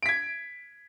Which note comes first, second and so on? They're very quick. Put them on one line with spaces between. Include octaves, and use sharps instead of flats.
D7 B6 G#6